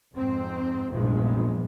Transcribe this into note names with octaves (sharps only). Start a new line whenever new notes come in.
F2 G#2 C4
F1 A#1 E2 G2 F3 G#3